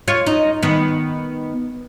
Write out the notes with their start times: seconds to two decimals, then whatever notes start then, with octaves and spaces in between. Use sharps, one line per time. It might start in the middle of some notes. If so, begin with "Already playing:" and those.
0.08 F4 C#5
0.27 D#4
0.63 D#3 B3